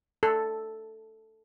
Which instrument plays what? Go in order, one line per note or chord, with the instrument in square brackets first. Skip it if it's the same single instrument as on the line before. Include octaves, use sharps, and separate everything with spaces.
[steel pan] A4